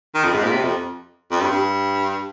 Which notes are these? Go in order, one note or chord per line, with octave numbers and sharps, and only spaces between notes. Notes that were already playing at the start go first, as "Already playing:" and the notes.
D#3
F2
G#2
A#2
C3
F2
F2
G2
G2